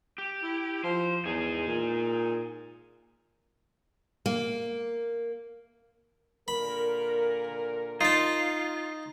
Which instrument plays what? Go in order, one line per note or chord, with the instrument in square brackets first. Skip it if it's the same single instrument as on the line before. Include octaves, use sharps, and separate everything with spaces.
[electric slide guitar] G4
[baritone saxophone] E4
[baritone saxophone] F3 [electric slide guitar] C5
[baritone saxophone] E2 [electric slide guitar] D#4 G#4
[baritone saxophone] A#2
[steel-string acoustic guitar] A#3
[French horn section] A#2 D3 A#4 [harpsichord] B5
[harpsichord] D#4 A5 [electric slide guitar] F4